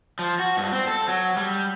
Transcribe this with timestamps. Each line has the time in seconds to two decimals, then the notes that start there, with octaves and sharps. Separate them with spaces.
0.19 F3
0.39 F#4
0.57 G2
0.72 C4
0.87 A4
1.08 F#3
1.37 G3